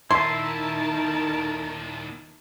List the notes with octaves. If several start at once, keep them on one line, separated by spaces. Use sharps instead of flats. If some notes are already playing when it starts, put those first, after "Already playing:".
D#2 A#2 D#3 E4 A#4 E5 A5 C6